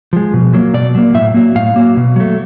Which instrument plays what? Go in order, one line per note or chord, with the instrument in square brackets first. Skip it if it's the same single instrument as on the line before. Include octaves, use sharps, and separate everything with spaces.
[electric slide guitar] F3 G#3
B2
F#3 A#3
B2 D5
F#3 A#3
A2 E5
F#3 A#3
A2 F5
F#3 A#3
B2
F#3 A3